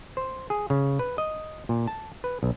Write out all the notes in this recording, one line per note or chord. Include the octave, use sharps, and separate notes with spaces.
C5
G#4
C#3
B4
D#5
A#2
A5
B4
B1